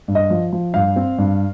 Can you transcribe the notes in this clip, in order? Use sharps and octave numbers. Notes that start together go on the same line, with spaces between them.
G2
D#5
F3
F3
G2 F5
C4
G2